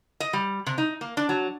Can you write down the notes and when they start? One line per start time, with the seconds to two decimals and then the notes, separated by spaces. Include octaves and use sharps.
0.20 D#5
0.33 G3
0.66 C3
0.78 D#4
1.01 A#3
1.17 D4
1.29 F#3